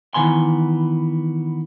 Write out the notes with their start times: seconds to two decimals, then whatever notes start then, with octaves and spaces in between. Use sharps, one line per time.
0.14 D#3 E3 B3 G#5 C6